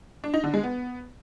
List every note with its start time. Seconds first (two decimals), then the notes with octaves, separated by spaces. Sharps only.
0.24 D4
0.34 D#4
0.44 D3
0.54 G#3
0.63 B3